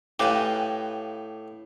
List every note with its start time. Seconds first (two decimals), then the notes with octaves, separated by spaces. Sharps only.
0.20 A2 G4 B4 F5 G#5